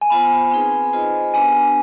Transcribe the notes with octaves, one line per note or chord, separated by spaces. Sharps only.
G#5
B3 F4 C5 B5
C4 D#4 G#4 B4
F4 G#4 C5 D#5
B3 D4 G4 B4 G#5